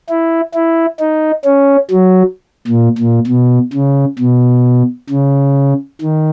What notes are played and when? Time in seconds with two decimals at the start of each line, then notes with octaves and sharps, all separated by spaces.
0.09 E4
0.54 E4
1.00 D#4
1.45 C#4
1.91 F#3
2.67 A#2
2.98 A#2
3.27 B2
3.73 C#3
4.19 B2
5.10 C#3
6.02 D#3